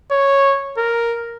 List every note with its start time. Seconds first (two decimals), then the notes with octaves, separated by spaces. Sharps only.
0.11 C#5
0.77 A#4